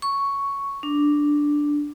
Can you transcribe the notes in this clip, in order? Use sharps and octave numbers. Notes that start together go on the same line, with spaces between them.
C#6
D4